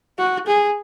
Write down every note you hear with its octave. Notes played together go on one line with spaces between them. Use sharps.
F#4
G#4